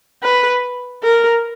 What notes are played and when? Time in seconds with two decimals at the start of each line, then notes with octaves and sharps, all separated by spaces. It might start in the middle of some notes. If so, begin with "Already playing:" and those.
0.23 B4
1.03 A#4